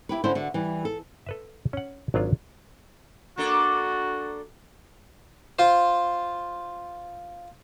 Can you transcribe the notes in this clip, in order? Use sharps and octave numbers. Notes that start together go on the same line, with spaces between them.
E4 G4 B4
D3 C#4 E4 C5
D3 F#4
E3 G3
A4
A4 B4 E5
C#4 F#5
G#1 F#3 G#3 D4 F4
A#3 D4 F#4 A4
F4 C5